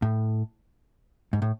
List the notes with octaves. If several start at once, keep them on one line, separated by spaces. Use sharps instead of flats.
A2
G#2
A2